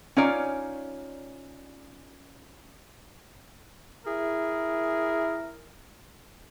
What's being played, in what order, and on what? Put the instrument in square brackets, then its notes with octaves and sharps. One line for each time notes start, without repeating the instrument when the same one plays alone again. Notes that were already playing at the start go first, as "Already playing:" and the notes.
[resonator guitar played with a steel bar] C#4 D#4 F4 C#5 D5
[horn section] E4 G#4 A#4